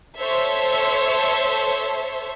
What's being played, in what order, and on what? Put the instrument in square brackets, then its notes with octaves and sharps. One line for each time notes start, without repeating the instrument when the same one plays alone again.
[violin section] A4 C5 C#5 E5